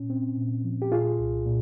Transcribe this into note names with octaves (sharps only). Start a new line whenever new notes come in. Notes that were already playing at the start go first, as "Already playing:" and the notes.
Already playing: A#2 C#4
C4
A#2
F3
G4
A#2 F4 G#4
C2
A#2